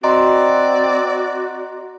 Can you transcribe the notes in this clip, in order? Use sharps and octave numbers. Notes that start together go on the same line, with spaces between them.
C4 F#4 D5 D#5 A#5 C6